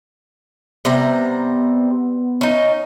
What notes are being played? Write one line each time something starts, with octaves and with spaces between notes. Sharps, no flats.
C3 G3 B3 A#5
C#4 D#4